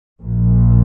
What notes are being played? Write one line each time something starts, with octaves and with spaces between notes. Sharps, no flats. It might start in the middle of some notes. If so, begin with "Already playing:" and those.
A#1 A#2